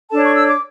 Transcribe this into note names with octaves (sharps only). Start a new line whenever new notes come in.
D4 A4 C#5 A5
C#6
E6
D6